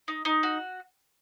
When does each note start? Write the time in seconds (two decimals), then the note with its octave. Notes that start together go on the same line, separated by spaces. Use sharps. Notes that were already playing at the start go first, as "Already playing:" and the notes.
0.08 D#4
0.25 D#4
0.43 F#4